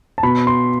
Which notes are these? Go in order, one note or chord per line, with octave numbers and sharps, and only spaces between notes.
A5
B2 B5
C6